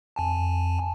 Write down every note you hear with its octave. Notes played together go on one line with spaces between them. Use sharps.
F2 G#5 A5